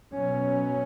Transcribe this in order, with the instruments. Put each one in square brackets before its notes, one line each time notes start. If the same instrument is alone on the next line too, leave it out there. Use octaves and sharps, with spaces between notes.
[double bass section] B2 F#3 C#4